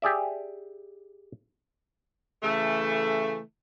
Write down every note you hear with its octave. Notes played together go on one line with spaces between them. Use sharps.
G4 G#4 D5 E5
C#3 E3 A3